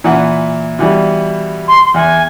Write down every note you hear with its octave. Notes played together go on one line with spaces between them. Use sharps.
A#2 E3 F#5
B2 E3 G3
C6
E2 G#5